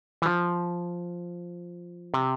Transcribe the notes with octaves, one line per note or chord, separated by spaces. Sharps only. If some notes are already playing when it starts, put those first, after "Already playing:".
E3
F3
C3